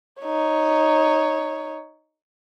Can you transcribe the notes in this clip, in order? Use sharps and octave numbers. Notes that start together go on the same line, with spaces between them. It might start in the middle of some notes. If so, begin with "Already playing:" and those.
D#4 C#5